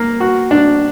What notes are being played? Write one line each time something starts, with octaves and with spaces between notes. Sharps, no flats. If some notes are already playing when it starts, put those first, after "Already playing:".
Already playing: A#3
F#4
D4